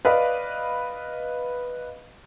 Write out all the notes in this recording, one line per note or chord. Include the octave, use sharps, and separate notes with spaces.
B4 D5 D#5 F5 B5